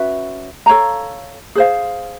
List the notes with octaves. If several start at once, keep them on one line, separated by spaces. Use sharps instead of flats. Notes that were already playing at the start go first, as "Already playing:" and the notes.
Already playing: C#4 F#4 B4 E5
A4 C#5 F5 A#5
G#4 C5 F5